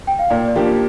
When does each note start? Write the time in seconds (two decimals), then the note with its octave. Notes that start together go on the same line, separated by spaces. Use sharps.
0.07 G5
0.19 F5
0.30 A#2 D5
0.48 D5
0.55 F3 A#3 D4 G4